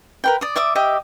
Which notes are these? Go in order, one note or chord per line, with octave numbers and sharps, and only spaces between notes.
A#4 B4 G5
D5 D#6
D5 E5 D6 D#6
G4 D#5 E5 D6